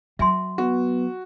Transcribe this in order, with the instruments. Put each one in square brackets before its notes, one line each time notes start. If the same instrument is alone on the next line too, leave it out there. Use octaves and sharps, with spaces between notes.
[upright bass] F#3 [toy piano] E5 G#5 C6
[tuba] B3 [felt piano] F#4